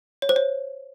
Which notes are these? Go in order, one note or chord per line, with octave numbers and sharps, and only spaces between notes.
C#5
C5
C#5